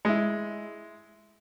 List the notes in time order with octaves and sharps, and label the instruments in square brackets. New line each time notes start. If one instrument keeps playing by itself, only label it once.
[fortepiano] G#3 E4